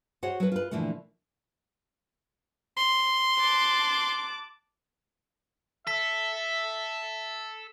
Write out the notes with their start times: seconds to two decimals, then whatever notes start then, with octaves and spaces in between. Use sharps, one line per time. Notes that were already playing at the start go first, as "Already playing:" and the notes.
0.23 F#4 G#4 C5 C#5 F#5
0.40 F#3 B4
0.52 F4 B4
0.71 A#2 D3 E3 F3 A3
2.77 C6
3.41 A5 D6 F#6
5.87 A4 E5 B6